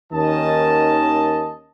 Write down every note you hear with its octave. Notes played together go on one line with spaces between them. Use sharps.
D#2 D#3 C#4 D#5 A5